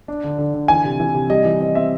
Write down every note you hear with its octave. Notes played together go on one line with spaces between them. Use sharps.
D4
D3
D3
D3
E3 G#5
C3
E3
C3
G3 D#5
E3
C4 D#5
C4 E5